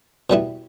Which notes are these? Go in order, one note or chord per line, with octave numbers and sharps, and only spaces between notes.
B2 G3 B3 E4